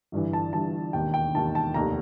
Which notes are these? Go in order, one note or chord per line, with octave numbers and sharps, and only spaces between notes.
G1 G2 E3
A5
G1 G2 E3 A5
E1 D#2 D#3 G5
G5
E1 D#2 D#3 A5
A5
F1 D#2 D#3 A#5